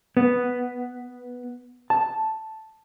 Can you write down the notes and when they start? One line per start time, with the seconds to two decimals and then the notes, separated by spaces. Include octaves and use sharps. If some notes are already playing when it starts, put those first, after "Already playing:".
0.17 B3
1.90 A5